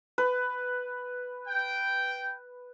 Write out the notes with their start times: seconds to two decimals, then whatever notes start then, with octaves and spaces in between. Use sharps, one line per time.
0.18 B4
1.48 G5